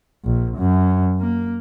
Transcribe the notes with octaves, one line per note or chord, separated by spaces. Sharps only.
A#1
F#2
A#3